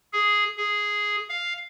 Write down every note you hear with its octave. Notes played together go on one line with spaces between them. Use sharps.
G#4
G#4
F5